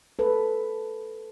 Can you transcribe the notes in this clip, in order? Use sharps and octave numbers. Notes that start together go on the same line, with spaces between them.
A4 B4